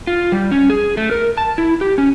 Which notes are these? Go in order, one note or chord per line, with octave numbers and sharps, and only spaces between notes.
F4
G3
C#4
G#4
A3
A#4
A5
E4
G4
C#4